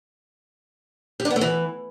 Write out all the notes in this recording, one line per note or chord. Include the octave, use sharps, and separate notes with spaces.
G4
D4
B3
A3
E3